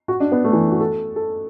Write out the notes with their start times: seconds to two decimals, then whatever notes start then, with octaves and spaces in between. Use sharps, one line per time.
0.08 F#4
0.20 D4
0.32 B3
0.44 A3
0.53 E3
0.71 F#4
0.80 A4
1.16 A4